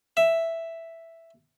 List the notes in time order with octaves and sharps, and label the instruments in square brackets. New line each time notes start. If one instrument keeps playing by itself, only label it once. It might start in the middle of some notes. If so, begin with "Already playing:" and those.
[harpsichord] E5